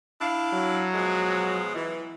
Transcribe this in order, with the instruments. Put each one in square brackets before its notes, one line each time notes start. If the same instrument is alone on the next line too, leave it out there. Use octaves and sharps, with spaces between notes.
[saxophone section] D4 E4 F5
[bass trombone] F#3
[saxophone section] B2 F3 G#3
E3